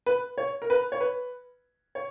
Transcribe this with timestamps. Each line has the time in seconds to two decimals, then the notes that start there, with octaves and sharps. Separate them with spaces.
0.06 B4
0.38 C#5
0.62 A#4
0.70 B4
0.92 C#5
1.00 B4
1.95 C#5